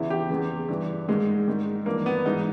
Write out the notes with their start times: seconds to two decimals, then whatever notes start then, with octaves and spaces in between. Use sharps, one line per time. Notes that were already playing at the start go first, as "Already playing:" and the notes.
Already playing: E2 C#3 E3 E4
0.10 G4
0.30 E2 C#3 E3
0.69 G2 E3
1.08 G#2 D#3 G#3
1.48 G#2 D#3
1.86 G2 E3 A#3
2.06 B3
2.26 G#2 E3 D#4